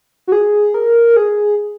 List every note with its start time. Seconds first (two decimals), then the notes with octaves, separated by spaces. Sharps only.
0.27 F#4
0.32 G#4
0.74 A#4
1.16 G#4